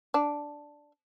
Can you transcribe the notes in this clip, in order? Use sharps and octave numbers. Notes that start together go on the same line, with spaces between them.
D4